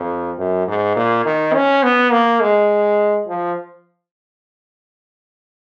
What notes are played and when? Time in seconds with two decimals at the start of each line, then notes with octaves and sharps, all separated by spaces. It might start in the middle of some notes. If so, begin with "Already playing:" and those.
Already playing: F2
0.38 F#2
0.68 G#2
0.96 A#2
1.25 D#3
1.54 C#4
1.83 B3
2.12 A#3
2.41 G#3
3.28 F3